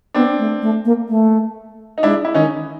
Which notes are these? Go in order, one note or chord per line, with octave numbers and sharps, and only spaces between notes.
B3 C4 D4
A3
A3
A#3
A3
D#4
G#3 D4 E4
E4
D#3 C#4 D#4